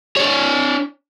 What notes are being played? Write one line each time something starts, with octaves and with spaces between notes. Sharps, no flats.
D4 C#5